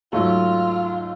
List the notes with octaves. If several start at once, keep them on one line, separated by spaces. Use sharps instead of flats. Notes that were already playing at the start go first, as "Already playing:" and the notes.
G#2 F#3 A3 F4